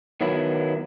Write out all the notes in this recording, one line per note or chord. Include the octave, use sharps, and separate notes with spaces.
D#3 F#3 B3 E4